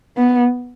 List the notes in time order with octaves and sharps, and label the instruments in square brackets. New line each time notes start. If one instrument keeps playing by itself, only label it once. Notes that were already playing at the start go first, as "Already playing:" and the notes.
[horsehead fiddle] B3